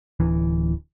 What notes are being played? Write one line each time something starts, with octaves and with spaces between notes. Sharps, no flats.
D1 E3